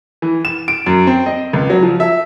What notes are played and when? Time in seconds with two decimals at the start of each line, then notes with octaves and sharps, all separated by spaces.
0.22 E3
0.45 E7
0.68 D7
0.86 F#2
1.07 C4
1.26 D#5
1.53 C#2
1.70 F#3
1.83 F3
2.00 E5